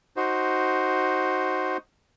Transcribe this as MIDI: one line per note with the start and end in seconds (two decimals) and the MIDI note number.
0.17 1.77 63
0.17 1.77 66
0.17 1.77 72